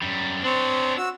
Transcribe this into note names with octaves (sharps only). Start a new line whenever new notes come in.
F#2 G3
C4 D4 C#5
F#4 E6